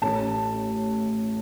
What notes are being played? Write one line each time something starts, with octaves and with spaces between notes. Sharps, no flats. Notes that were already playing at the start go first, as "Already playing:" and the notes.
A1 A2 A3 C#4 A5